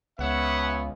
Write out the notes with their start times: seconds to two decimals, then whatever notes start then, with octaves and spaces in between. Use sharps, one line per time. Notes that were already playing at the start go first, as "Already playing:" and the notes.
0.19 C#2 B3 C#5 E5 F#5